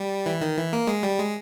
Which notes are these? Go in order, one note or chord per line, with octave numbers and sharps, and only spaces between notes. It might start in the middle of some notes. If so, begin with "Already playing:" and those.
Already playing: G3
E3
D#3
E3
A#3
G#3
G3
G#3